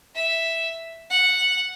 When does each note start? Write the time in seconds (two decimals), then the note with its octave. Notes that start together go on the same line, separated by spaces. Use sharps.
0.15 E5
1.10 F#5